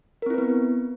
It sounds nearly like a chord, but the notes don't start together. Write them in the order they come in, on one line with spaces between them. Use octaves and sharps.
A#4 C4 E4 B4 B3